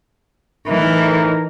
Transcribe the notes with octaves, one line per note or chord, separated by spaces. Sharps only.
A2 E3 D#4 A#4